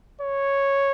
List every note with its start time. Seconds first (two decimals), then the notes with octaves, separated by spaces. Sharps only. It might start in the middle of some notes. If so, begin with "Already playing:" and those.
0.21 C#5